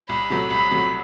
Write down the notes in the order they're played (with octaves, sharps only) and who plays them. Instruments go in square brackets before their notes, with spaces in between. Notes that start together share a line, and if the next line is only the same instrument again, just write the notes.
[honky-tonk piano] C2 [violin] B5
[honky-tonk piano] C3 F#3 A3
[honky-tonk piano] C2 [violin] B5
[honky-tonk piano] C3 F#3 A3